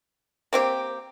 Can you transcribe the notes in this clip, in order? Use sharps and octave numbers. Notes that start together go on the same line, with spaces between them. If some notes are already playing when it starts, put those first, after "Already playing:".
A#3 C4 G4